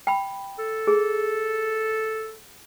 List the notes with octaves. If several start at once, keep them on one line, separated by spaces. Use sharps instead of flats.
G5 B5
A4
G#4